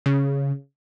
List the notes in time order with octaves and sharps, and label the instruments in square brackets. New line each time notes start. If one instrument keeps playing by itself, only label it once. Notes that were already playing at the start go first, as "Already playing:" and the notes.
[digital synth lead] C#3